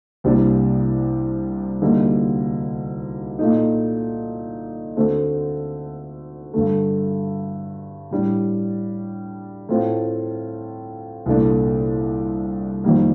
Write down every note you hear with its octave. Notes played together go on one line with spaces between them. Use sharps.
C2 C3 G3 A#3 D4
D2 D3 G3 A#3 D#4
A#2 A3 D#4
D2 D3 A3 C4
G2 D3 A3
A2 G3 D4
A2 A3 C4 F4
C2 A#2 A3 D4
F2 D#3 G3 A#3